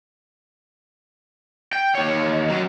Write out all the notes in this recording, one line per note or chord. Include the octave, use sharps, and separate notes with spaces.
G5
D#2 C#5
F#3 C#4